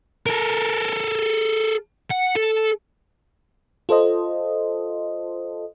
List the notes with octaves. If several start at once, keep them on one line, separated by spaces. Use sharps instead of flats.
A4 A#4
F#5
A4
F4 A4 C5 D#5